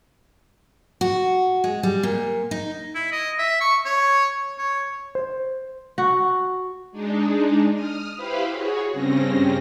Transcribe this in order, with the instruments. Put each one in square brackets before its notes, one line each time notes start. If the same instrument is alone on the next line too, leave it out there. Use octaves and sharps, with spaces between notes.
[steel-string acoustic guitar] F#4
G#3
G3
A#2
D#4
[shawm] E4
D#5
E5
C#6
C#5
C#5
[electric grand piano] C5
[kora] F#4
[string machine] G#3 D4 D#4
D#6 F6
E4 G4 B4 C5 F5 B5
F#4 G#4 C#5
G2 C#3 C4 C#4 A#6